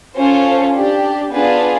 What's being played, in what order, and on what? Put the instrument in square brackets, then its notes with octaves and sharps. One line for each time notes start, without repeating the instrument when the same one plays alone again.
[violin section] C#4 F4 A4 C5
D4 G4
B3 D4 F4 G#4 B4